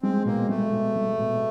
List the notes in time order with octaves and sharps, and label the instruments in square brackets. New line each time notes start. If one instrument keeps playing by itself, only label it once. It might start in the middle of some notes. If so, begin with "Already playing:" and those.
[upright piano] G#3 [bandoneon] C4
[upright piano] B2 [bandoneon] A#3
[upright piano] G#3 [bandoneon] A3
[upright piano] B2
G#3
B2